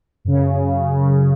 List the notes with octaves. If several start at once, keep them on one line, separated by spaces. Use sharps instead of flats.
F#2 C#3